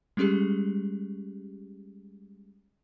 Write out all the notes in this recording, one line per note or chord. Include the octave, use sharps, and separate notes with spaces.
G3 G#3 C#4 G4 G#4